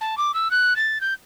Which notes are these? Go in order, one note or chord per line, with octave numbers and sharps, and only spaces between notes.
A5
D6
E6
F#6
A6
G6